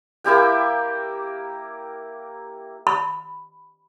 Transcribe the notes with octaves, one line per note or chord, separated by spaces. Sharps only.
A#3 E4 G4 G5
B5